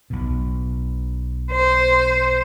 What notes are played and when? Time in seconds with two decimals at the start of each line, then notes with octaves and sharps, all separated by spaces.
0.10 B1 B2
1.52 C5